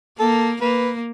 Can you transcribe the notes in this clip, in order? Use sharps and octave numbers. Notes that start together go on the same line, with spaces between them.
A#3 A4
A#3 B4